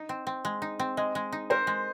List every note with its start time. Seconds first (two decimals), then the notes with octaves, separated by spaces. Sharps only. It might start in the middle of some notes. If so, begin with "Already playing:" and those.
Already playing: D#4
0.09 C4
0.27 C4
0.45 G#3
0.62 D#4
0.79 C4
0.97 G#3 D#5
1.15 G#3
1.32 D#4
1.50 A#4 C5
1.67 G#3